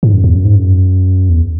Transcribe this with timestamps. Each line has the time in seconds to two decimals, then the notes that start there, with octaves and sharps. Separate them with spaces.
0.03 G#2
0.13 F#2
0.24 E2
0.34 F#2
0.45 G#2
0.56 F#2
1.29 E2